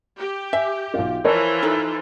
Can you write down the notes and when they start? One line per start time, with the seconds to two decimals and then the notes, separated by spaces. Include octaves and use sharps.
0.19 G4
0.53 E5 G#5
0.94 B1 F4
1.24 E3 F3 F4 A#4 C#5 A5
1.63 D#4 A4